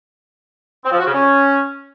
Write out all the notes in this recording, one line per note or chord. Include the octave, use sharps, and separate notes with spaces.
C4
F3
F#4
C#3
C#4